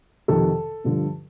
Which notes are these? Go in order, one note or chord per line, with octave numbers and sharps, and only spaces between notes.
F2 C3 D#3 A4
G2 D3 F3